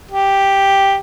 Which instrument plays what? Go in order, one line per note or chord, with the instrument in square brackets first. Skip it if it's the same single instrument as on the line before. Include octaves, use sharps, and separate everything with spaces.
[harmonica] G4